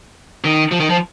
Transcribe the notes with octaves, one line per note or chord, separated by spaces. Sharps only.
D#3
F3
D#3
F3